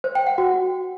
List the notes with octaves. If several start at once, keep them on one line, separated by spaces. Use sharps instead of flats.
C5
G5
F#5
F#4